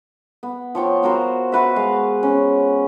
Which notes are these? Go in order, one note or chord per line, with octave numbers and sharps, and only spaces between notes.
B3
F3 C#5 G5
B3 F#4 A#4 C5
F#4 B4 E5
G#3 F5
C#4